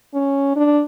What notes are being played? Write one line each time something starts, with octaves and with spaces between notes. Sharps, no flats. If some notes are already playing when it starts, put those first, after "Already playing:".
C#4
D4